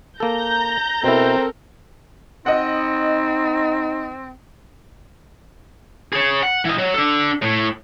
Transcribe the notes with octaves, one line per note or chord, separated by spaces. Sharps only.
A#3 A4 A#5 G6 A#6
B2 C4 E4 A4 A#4
C4 D#4 D#5 F#5
G#4 C#5
F#5
E3 D#5
F#3
D4 A4
A2